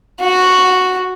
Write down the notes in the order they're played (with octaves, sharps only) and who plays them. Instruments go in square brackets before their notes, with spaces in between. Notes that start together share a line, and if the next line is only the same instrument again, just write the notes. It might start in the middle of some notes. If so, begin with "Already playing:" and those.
[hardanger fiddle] F#4